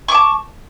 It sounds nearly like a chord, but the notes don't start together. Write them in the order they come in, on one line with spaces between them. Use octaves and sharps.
C#6 D6 A5